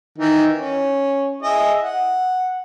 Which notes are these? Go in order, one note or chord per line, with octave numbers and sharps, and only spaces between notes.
D#3 E3 D#4
C#4
E4 G#4 D#5
F#5